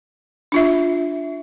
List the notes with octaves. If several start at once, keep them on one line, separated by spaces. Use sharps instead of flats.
D4 F4 E5